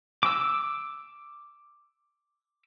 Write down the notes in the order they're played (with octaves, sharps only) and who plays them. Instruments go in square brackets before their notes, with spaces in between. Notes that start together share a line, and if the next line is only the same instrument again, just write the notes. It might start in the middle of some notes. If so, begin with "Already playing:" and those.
[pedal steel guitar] D6 E6